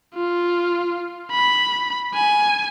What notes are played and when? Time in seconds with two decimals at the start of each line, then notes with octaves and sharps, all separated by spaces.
0.15 F4
1.31 B5
2.15 G#5